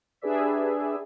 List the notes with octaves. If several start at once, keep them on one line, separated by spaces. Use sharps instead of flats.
D4 G4 G#4 B4 D5 E5